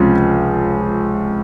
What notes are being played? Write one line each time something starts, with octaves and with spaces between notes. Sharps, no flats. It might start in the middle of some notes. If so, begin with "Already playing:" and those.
Already playing: C#2 C3 F3 C#4